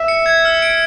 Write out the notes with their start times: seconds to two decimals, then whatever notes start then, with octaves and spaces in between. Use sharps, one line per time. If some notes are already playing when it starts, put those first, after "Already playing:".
Already playing: E5
0.08 C#7
0.26 G#6
0.45 F6
0.62 D7